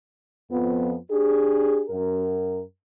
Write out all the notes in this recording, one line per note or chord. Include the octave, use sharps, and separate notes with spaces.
F2 F3 B3
D4 G4 G#4
F#2 A#4